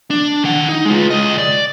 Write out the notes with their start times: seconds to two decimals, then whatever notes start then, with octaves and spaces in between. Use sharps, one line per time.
0.10 D4
0.44 D#3 F#5
0.69 D#4
0.85 G#3 F4
1.10 C#2 D#5
1.38 D5